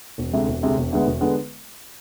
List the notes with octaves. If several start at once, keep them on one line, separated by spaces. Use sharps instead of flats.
E1
D2 C3 G#3
E1
D2 C3 G#3
E1
D2 D3 G#3 B3
E1
D3 G#3 B3